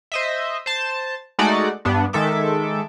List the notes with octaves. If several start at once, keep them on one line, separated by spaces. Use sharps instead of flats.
C5 D#5 E5
C5 A5
G#3 A3 D#4 F#4 D5 F#5
G2 B3 D4
D#3 G#3 A4 E5 D6